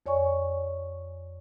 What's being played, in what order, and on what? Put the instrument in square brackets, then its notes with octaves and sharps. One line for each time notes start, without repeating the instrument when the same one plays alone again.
[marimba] F2 C#5 D5 G#5 C#6